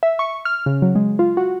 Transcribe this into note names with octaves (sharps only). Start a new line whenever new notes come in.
E5
C#6
F6
C#3
F#3
G#3
F4
F#4